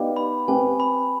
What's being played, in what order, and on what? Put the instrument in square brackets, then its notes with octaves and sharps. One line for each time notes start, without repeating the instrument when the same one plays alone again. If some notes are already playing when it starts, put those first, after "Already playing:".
Already playing: [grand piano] B3 D#4 G4 D5 F5
[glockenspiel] B5
[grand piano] C4 G4 B4 [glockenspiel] G#5
[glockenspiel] B5